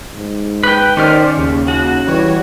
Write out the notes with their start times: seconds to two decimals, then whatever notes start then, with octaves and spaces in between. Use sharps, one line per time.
0.15 G#2
0.63 B4 G5
0.97 D#3 C#4 G4 C5 D5 F6
1.37 D#2 C#3
1.68 F#4
2.07 E3 G3 C#5